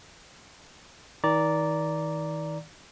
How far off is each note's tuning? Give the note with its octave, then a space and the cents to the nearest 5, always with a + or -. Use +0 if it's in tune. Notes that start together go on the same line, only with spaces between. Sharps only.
D#3 +35 D5 -10 A#5 +0